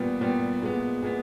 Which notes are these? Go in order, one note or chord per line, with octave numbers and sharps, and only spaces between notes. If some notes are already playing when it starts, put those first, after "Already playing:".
Already playing: A#2 G3 B3
A#2 G3 B3
A#2 G#3 B3
A#2 G#3 B3